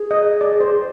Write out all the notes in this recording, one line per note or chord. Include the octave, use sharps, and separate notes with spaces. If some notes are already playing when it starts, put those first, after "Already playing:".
Already playing: G#4
D#5
D5
C5